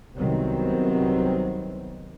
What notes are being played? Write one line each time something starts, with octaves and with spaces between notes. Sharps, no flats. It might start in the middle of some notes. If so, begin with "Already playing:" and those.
C2 C3 D#3 F#3 B3 C4